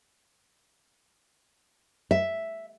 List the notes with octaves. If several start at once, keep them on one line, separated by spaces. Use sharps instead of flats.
E5